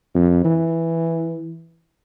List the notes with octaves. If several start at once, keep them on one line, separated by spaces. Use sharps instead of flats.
F2
E3